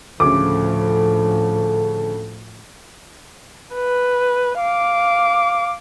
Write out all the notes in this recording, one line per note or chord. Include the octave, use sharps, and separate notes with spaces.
D2 A2 C#3 F3 A4 D6
B4
F5 D6